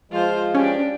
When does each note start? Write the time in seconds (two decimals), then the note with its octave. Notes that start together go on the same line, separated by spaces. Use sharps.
0.12 F3 G#3 F4 C5
0.55 C#4 D4 G4